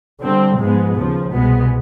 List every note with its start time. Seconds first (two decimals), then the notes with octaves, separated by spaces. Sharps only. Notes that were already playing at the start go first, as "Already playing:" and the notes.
0.21 D3 G3 C4
0.58 G#2 F3 G#3 B3
0.96 D#2 C#3 F3
1.32 C2 B2 G#3 B3